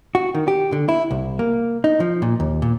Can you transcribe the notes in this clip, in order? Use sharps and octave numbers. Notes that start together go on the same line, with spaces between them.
F#4
D#3
G4
D3
E4
C2
A#3
D#4
F3
A#2
D#2
A#2